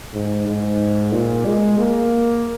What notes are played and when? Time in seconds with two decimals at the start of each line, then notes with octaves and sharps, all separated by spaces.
0.13 G#2
0.47 G#2
1.12 A#2
1.46 G#3
1.78 A#3